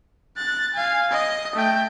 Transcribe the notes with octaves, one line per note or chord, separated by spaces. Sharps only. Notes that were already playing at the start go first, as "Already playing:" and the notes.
F#6 A6
F5 G#5
D#5
A3 G5